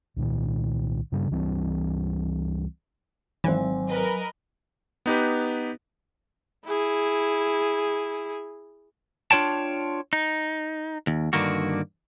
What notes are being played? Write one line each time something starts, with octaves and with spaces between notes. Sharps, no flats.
C2 A#2 D#3
G2 C#3 G3 D4
C#2 E3 G3 C4
G#1 E3 F#3 C4 G#5
A#4 B4 D#5
B3 D#4 G4 B4
E4 G#4
D4 F4 C#5 G5 A5
D#4
D#2
G2 D3 D#3 A#3 F#4